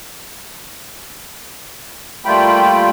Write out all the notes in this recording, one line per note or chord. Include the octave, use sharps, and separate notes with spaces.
G3 A3 A#3 F4 G5 B5